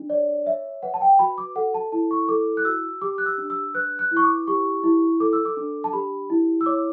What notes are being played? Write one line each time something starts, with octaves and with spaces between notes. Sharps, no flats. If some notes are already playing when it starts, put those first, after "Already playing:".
Already playing: D4
C#5 D5
C#5 E5
B4 F#5
A5
G5
F#4 B5
D6
A4 F#5
A5
E4 A5
C#6
A4 D6
F#6
F#4 E6
G4 D6
F#6
E6
D4
E6
B4 F#6
F#6
E4
C#6
D6
G4 C#6
E4
A4 D6
E6
D6
D4
A5
G4 B5
E4
E6
C#5 D6